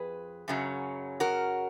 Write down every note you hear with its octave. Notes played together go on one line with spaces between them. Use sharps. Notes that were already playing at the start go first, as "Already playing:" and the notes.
Already playing: F2 G#4 B4
F#2 C#3 F#3
F#4 A#4